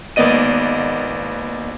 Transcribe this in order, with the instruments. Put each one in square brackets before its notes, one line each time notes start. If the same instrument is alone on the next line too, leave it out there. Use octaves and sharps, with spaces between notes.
[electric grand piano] G#1 A#3 B3 D5 D#5 D#7